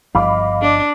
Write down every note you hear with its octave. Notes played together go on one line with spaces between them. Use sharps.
G1 G2 F3 D#5 F5 B5 D6
D4